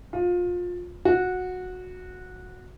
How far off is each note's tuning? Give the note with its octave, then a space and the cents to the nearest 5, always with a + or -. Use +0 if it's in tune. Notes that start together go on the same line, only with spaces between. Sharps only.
F4 +25
F#4 -15